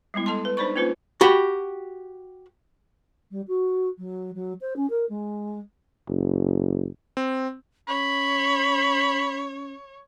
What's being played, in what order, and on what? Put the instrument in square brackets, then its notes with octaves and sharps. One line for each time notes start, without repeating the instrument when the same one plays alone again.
[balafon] G3 G#3 B3 E4
A4 D#5 A5 C6
B4
D4 D#4 C5 D5 B5 C#6
A#3 C#4 F4 B4 C5
[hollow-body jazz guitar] F#4 G4 B5
[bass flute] G3
F#4
F#3
F#3
C5
C#4
A#4
G#3
[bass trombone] F#1
[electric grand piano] C4
[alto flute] C#4 [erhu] C#5 [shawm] B5